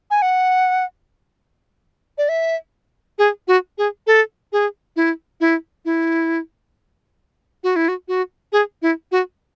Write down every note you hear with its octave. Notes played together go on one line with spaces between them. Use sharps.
G#5
F#5
D5
E5
G#4
F#4
G#4
A4
G#4
E4
E4
E4
F#4
E4
F#4
F#4
G#4
E4
F#4